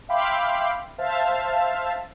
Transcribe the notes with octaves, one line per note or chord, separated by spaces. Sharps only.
E5 F5 G5 B5 C6 D6
C5 E5 F5 A5